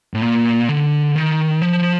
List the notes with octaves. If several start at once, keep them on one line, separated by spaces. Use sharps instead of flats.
A2
A#2
D3
D#3
F3